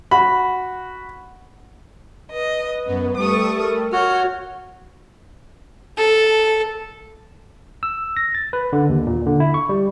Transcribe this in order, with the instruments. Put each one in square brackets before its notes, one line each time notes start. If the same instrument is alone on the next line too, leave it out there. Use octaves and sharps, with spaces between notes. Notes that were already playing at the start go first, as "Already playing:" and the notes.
[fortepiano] F#4 B5
[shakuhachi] B4 [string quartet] D#5
[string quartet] F#2 [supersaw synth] B3
[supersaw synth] G3 A3 A4 [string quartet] C#6 D#6
[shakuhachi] A#4
[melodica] F#4 [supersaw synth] C#5 [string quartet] F6 G6
[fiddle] A4
[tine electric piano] E6
A#6
A6
B4
D3
D#2
A#2
D3
E4
C#6
G3